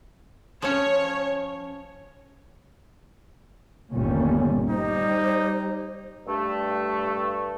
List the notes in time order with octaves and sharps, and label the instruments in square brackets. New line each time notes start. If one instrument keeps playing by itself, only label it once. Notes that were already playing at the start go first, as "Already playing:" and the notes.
[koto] F3 C#4 [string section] C#5
[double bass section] G1 D#2 A#2 G3 A3 C#4
[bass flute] G3 [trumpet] D#4 [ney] C5
[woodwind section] G2 A3